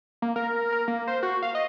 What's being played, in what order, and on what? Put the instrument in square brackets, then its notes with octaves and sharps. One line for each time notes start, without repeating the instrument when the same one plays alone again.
[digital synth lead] A#3
A#4
A#4
A#3
C5
F#4
F5
D#5